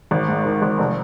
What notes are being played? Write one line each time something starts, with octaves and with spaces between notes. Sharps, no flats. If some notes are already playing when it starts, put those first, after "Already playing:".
G#1
G#2
D#3
G#1
F1